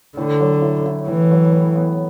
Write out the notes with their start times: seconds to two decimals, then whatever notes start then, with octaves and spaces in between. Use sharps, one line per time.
0.17 A2 D3
0.40 F#3
0.62 E4
0.86 E4
1.08 A2 E3
1.31 F#3
1.53 A2
1.76 B3